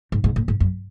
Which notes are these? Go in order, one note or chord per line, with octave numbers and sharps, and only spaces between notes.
G#2
G#2
A2
G#2
F#2